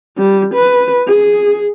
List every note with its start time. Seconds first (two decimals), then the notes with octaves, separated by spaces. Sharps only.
0.18 G3
0.54 B4
1.08 G#4